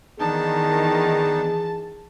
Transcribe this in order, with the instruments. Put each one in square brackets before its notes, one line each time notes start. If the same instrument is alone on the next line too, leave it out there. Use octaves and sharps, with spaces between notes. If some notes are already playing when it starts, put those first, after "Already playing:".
[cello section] D#3 E3 [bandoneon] B3 D4 D#4 [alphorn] G#4 [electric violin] A5